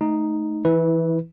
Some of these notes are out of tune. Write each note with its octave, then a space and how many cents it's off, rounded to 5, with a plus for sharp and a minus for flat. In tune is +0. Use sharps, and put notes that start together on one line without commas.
A3 -15 D#4 +0
E3 +0 E4 -25 B4 +0